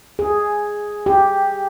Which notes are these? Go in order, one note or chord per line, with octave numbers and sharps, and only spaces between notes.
G#4
G4